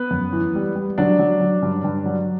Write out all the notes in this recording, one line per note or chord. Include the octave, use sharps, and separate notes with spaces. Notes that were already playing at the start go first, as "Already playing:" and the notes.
Already playing: B3 B4
F#2
E3
G3
G3
F#3 D4 D5
F#3
F#3
G2
G2
F#3